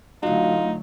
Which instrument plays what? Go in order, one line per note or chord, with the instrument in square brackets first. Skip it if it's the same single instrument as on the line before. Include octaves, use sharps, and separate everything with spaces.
[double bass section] D3 F#3 A3 [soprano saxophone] D#4 [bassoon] F4 [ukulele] F#4 F5